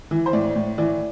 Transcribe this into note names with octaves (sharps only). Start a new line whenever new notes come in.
E3
C5
A2 D5
A2
E3 D5